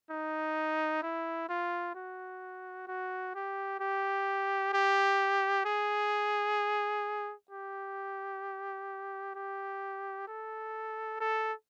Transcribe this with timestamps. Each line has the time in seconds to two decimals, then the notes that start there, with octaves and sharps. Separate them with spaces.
0.11 D#4
1.03 E4
1.49 F4
1.95 F#4
2.87 F#4
3.35 G4
3.80 G4
4.74 G4
5.65 G#4
7.51 G4
9.35 G4
10.28 A4
11.21 A4